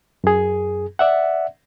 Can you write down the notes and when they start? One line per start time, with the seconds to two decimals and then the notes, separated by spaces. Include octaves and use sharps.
0.24 F#2 G#4
0.99 D5 E5 F#5